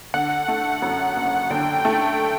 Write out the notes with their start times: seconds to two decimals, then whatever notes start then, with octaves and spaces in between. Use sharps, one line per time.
0.14 D3 F#5
0.48 A3
0.82 F#2
1.16 F#1
1.50 D3 G5
1.85 A3